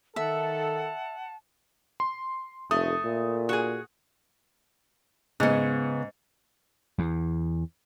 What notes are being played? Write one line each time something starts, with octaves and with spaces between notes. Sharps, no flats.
D#3 A4 E5 F#5 A5
C6
F1 A3 D#6
A#2
F#4 G#4
G#2 C#3 B3
E2